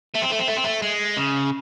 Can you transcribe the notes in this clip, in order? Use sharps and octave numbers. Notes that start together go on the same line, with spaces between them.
A3
C4
A3
C4
A3
C4
A3
G#3
C#3